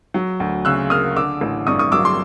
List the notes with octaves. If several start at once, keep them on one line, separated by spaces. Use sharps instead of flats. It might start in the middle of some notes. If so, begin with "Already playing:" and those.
F#3
D2
C#3 E6 F#6
A#3 D#6 F6
D3 D6 E6
A1
G2 C#6 D#6
C#6 D#6
F#3 D6 E6
C6 D6